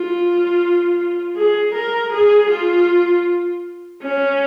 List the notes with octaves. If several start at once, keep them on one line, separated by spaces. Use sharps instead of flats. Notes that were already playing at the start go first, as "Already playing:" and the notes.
Already playing: F4
G#4
A#4
G#4
F4
C#4